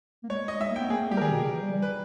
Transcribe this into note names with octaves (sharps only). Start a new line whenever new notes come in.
A#3
G#3 C#5
D#5
G#3 E5
A#3
G5
B3
A#3 G#4
A#3
G3 G4
A#4
D#3 G#4
B2
C#3
E3
G3
G3
B4